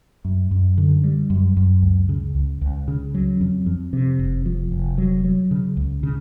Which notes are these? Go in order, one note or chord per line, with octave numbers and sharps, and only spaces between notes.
F#2
F#2
D3
G3
F#2
F#2
C#2
C#3
C#2
C#2
C#3
F#3
F2
F2
C3
F1
F3
F1
F#3
F#3
C#3
C#2
C#3